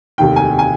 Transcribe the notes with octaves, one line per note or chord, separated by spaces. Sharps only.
F1 D#2 D#3 G5
G#5
G#5